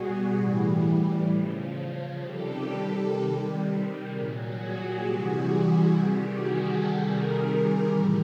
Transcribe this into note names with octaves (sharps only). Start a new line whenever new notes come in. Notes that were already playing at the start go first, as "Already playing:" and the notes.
Already playing: B2 G3 F#4 G#4
A2 E3 G3
C#3
F3
C3 D#3 G3 G4 A4
C3 D#3 G3
A#2 F#3 G#4 A#4
F#4 G#4
G4
C3 E3 G3 F#4 G#4
C3 D#3 G3 G4
F#4 G#4
G4 A4
C3 D#3 G3 G#4 A#4
A2 E3 G3